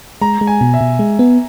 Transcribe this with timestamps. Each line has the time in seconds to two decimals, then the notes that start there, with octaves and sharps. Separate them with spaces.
0.21 G#3 A#5
0.41 G#3
0.47 G#5
0.61 B2
0.74 E5
0.81 B2
0.99 G#3
1.19 B3